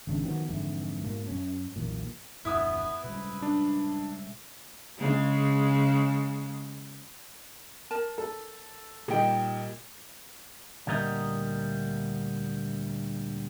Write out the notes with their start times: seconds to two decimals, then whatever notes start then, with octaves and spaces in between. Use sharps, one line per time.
0.07 G#1 F2 C#3 D4
0.24 D#3 F3 F#3 B3
0.49 F2 G#2 D3 E3
1.04 G#2 B2 A#3
1.27 F#2 C#4
1.76 B1 E2 A#2
2.45 D#1 F#2 B3 D4 E4 D#6
3.04 B2 G3 G#3 B4
3.42 D4
4.99 C#3 G#3
7.91 A#4 A5
8.18 A4
9.08 A#2 G3 D#4 D#5 G5
10.87 D2 A#2 G3 A#4 D#5